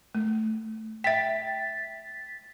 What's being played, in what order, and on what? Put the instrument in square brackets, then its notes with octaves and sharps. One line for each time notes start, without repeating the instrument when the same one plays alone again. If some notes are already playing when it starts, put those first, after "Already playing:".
[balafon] A3
[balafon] E5 G5 [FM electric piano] A6 B6